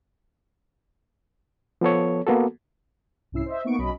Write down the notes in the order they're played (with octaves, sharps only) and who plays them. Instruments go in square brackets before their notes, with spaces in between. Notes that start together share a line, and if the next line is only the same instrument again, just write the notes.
[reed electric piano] F3 B3 A4 C#5
A#3 B3 F#4 A4
[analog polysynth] C2 G#2 C#4 E4 E6 C7
C5 D#5 E5
A#3 B3 D#4 C#6 D7
B1 F#3 C#4 D#5 B5